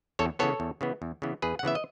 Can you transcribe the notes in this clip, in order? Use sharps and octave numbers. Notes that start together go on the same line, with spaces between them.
E2 A4 C#5
C#3 E3 B3 A4 C#5
E2
C#3 E3 B3
E2
C#3 E3 B3
E2 G#4 B4
F#5
C#3 E3 B3 E5
D#5